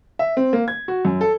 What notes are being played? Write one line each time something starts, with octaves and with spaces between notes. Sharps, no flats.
E5
C4
A#3
G#6
F#4
F#2
A4